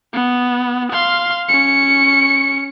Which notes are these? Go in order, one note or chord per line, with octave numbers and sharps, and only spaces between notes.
B3
F5 C6
C#4 C#7